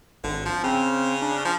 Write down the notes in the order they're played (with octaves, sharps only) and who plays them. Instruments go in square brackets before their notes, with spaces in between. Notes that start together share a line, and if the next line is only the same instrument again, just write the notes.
[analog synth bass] G#1 [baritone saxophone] D3
[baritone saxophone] F3
[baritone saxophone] C#3 [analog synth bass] C4
[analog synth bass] D4
[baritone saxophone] F3